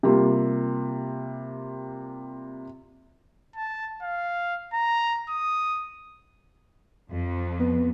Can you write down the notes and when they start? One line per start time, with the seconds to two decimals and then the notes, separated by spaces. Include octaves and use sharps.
0.03 C3 G3 A#3 F4
3.56 A5
4.02 F5
4.74 A#5
5.29 D#6
7.09 F2
7.59 B3